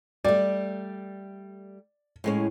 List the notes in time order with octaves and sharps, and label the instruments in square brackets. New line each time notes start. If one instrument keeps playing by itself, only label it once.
[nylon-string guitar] G3 A3 [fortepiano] D5
[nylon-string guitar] A2 G#3 C#4